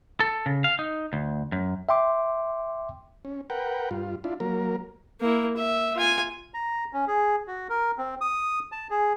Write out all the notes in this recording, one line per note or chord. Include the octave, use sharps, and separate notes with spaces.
A4
C#3
F5
D#4
D2
F#2
E5 G5 C6 D6
C#4
A#4 B4 F#5 G5
G2 F4
D4 E4 F4
F#3 A#3 A#4
A#3 E4
E5
F4 G#5
A#5
C#4
G#4
F#4
A#4
C4
D#6
A5
G#4